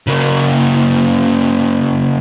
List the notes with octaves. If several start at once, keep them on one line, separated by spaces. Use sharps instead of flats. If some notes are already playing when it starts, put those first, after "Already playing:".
C#3 A#3